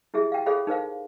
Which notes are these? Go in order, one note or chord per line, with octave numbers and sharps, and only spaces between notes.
E4 G4 G#4 E5
F5 G5
G#4 A4 C#5 F5 B5
D#4 A#4 C5 F5